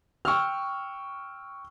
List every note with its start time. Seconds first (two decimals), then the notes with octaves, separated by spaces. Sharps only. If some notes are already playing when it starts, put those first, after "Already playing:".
0.25 G5 C#6 E6 F6